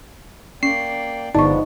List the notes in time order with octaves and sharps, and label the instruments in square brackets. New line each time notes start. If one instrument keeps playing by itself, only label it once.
[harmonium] A#3 D5 G5 [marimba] C#4 [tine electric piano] C7
[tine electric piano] G1 D5 [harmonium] F3 G#3 B3 [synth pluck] D#4 [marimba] A5 C#6